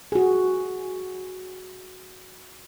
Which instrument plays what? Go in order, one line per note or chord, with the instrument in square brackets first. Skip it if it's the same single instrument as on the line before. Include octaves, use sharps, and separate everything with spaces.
[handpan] F#4 G#4